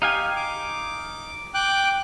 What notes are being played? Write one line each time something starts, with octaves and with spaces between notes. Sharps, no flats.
D#4 G4 F5 G#5
D6
G5 D6 F#6